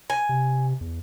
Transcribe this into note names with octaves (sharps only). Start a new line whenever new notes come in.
G#5
C3
E2